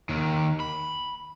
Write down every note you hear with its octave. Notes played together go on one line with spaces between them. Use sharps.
D#2 D#3
B5